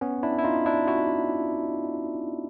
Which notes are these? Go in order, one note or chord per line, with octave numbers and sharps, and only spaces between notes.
B3 C#4
D4 E4
E4
D#4 F4
D4 E4
E4 F#4